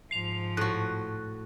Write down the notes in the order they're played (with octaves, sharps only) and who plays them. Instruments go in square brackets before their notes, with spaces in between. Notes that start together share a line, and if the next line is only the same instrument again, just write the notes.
[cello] G#2 F3 [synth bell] C7 F7
[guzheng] A2 F#4 [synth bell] F#6